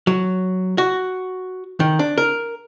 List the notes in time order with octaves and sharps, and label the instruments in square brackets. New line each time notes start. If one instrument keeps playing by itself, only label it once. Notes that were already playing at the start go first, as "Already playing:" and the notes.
[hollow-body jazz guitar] F#3
F#4
D#3
D4
A#4